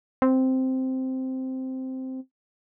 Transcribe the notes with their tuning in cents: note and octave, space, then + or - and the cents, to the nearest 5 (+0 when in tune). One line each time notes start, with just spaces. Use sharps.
C4 -5